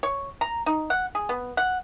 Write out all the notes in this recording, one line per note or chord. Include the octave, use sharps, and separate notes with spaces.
C#5
A#5
D#4
F#5
G#4
B3
F#5